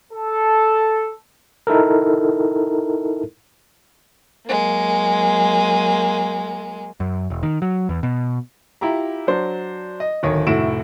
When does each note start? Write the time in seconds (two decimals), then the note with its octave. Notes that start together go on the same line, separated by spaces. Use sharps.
0.12 A4
1.67 D#4 E4 A4 A#4
4.46 F#3 G#3 A#3
7.00 F#2
7.30 E1
7.43 D#3
7.62 F#3
7.89 E2
8.03 B2
8.81 E4 F4 G4 A#5
9.27 F#3 D4 C5
10.00 D#5
10.23 D1 D#3 C#5
10.47 F1 A2 E4 F#4 D7 E7